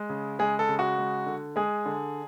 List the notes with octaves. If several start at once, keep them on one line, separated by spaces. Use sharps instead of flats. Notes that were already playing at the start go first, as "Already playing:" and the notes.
Already playing: G#3
C#3
G#3 G#4
A4
C#3
F#4
G#3
D3
G#3 G#4
D3